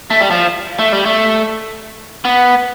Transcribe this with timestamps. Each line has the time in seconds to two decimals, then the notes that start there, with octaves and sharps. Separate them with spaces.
0.10 A3
0.21 G3
0.31 F3
0.79 A3
0.92 G3
1.06 A3
2.25 B3